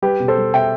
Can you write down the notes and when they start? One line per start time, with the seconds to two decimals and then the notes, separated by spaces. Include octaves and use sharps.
0.02 G3 G4 B4
0.20 B2
0.28 A4 C5
0.37 G3
0.53 B2 E5 G5